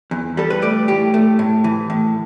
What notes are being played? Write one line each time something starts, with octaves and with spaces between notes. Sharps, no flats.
E2
G3 A4
B4
A3 D5
A2 G4
A3
A2
E3
A2